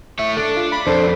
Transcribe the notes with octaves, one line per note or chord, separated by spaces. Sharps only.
A3 C#5 E5
D4 A4
F4
B5
F2 D4 A4 C5